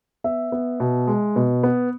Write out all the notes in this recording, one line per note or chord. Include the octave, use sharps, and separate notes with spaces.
B3 E5
B3
B2
G#3
B2
B3